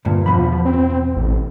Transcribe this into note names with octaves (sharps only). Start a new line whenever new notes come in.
D2 G2 A#2
E2 B2 F3 B5
C4
A1